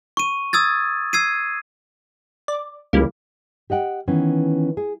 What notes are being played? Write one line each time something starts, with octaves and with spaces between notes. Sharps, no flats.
C#6 D#7
D#6 E6 G#6 A6
E6 G#6 C7 D#7
D5
C#2 E3 G3 A#3
G4 D#5 F#5 G5
D#3 E3 B3 C#4
G#4